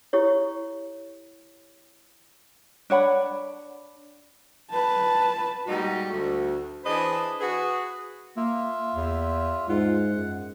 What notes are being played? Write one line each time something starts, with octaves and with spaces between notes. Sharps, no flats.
E4 G4 C#5
D4 C#5 F#5 B5
B4 A5
A#2 G3 G#3 D#4 F#4
D2 A3 F#4
E3 D4 G#4 B4 C5 D#5
F#4 G#4 B4
A#3 F4 E5
E2
G#2 F4 F#5
F#2